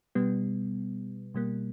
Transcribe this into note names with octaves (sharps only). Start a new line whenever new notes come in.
B2 G3 B3
B2 G3 A#3